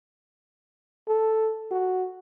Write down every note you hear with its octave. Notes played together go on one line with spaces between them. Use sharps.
A4
F#4